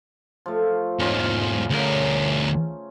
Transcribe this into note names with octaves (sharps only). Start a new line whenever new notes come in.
F3 A3
E2 G#2 C#4 D#4 F4
D2 C#3 A#4